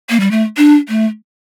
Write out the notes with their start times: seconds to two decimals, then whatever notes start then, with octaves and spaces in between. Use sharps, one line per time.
0.10 A#3
0.20 G3
0.31 A3
0.57 D4
0.89 A3